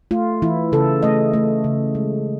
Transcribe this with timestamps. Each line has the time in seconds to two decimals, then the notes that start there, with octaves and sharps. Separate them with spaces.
0.11 A3 F4
0.42 E3 E4
0.72 C#3 A4
1.03 A3 D#5
1.34 A3
1.64 C#3
1.95 G#3